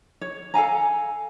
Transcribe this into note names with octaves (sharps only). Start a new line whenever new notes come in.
C#5
A4 F5 G#5 A#5